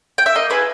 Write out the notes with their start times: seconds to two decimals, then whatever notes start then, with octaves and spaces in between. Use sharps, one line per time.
0.18 G5
0.26 E5
0.35 A#3 D#5
0.50 E4 G#4 B4